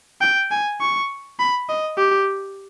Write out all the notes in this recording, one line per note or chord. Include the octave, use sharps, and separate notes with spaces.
G5
G#5
C#6
B5
D#5
G4